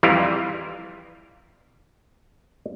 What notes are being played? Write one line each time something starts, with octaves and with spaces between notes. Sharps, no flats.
F2 E3 G3 E4 F4 A#5